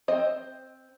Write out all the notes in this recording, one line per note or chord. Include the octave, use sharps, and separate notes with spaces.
C4 C5 D#5